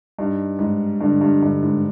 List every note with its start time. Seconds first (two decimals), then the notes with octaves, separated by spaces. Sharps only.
0.18 G2 D#4
0.59 G#2 D#4
1.01 G2 D3
1.21 G2
1.42 G2 D3
1.63 G#2